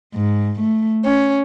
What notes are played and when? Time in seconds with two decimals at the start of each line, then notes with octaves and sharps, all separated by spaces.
0.14 G#2
0.59 A3
1.05 C#4